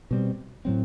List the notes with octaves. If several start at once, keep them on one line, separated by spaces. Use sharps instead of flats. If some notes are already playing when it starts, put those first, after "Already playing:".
B2 G3 C4
A2 F#3 C4